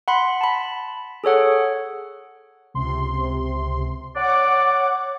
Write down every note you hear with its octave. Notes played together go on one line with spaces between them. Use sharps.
F#5 B5 C6
A5 B5
G#4 A4 C#5 F#5
C#2 C3 C6
C#5 D5 F#5 D6